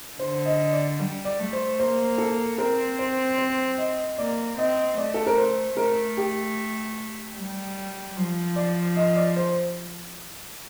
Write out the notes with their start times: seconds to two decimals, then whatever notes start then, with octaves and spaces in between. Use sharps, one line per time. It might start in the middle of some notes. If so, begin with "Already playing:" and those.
0.19 D3 C5
0.46 D#5
0.73 D5
0.99 G3
1.25 D5
1.39 A3
1.53 C5
1.79 A#3 C5
2.18 A4
2.58 C4 A#4
2.99 C5
3.38 C5
3.78 D#5
4.18 A#3 D5
4.57 C4 D#5
4.98 A3 D5
5.14 A4
5.27 A#4
5.38 C5
5.77 A3 A#4
6.17 G4
7.37 G3
8.16 F3
8.56 D5
8.96 D#5
9.16 D5
9.36 C5